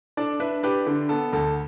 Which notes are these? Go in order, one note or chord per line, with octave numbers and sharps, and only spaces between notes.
D4 A4 D5
D4 B4 E5
D4 G4 B4
D3
B3 A4
D2 A4